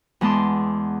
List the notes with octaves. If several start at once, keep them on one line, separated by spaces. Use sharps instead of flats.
E2 G#3 B3 A5 C6 D6